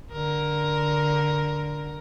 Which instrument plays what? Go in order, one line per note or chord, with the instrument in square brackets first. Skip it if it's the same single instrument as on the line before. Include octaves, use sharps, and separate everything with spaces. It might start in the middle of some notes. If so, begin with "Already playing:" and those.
[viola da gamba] D3 A#4